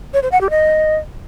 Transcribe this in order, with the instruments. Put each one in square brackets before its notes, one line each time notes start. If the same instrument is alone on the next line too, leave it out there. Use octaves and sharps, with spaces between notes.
[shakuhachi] C#5
C5
F#5
G4
D#5